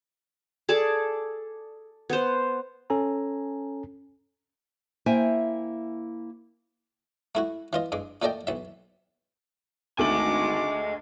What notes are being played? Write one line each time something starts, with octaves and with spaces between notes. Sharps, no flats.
G#4 A4 D5 A5
B3 C5
C#4 A4 G#5 A#5
A#3 E4 C5 E5 G5 G#5
A3 E4 F#4
E3 F4 D#5
G2 G#3 D6
A#2 A3 A4 D5 D#5 G5
B1 E5
G#1 D2 A3 D#5 G#5 D6 F#7